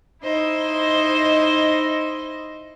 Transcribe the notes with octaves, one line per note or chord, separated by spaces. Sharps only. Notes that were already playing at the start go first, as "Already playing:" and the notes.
D#4 E4 C5 D#5